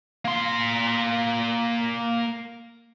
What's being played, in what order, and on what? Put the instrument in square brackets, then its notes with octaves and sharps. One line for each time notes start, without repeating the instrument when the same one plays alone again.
[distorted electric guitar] A#3 C6